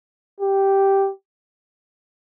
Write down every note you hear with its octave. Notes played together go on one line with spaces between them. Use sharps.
G4